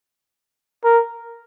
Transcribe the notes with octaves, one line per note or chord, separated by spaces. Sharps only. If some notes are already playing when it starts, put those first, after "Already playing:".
A#4